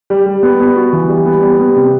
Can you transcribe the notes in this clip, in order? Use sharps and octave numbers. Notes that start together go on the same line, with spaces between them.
G3
G3
B3
B3
F#4
E3
G3
B3
G3
B3
C3